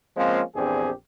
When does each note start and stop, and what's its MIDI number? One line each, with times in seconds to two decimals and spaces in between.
0.17 0.41 53
0.17 0.41 56
0.17 0.41 58
0.17 0.41 60
0.17 0.41 61
0.17 0.41 65
0.55 0.90 34
0.55 0.90 40
0.55 0.90 60
0.55 0.90 62
0.55 0.90 67
0.55 0.90 68